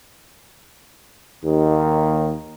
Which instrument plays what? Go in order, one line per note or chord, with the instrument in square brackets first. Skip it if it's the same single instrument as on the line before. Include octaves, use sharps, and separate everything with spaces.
[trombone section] D#2